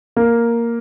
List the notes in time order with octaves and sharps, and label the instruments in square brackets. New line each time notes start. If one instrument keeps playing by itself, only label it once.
[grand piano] A#3